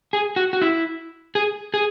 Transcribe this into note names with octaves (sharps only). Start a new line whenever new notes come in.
G#4
F#4
F#4
E4
G#4
G#4